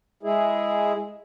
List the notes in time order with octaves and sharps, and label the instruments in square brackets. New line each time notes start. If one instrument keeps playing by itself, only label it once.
[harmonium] G#3 E4 G#4